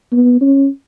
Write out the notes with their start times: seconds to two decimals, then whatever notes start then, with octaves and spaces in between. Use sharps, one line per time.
0.12 B3
0.41 C#4